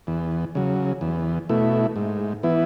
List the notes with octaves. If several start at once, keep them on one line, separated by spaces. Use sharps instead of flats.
E2
C#3 F#3
E2
B2 A3 E4
G#2
E3 B3 E4